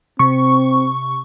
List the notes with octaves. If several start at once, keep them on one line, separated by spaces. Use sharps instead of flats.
C3 C4 C#6